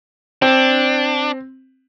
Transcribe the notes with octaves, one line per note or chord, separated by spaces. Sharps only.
C4 D4